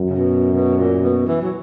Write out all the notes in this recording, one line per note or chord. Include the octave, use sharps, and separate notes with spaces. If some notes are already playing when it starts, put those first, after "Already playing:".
Already playing: F#2
C#3
B2
B2
A#2
B2
E3
F#3